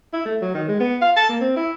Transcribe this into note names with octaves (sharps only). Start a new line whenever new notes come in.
E4
A3
F#3
D#3
G#3
B3
F5
A5
A#3
C4
E4